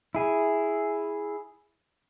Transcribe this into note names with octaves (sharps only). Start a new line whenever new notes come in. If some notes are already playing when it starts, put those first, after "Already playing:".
E4 G#4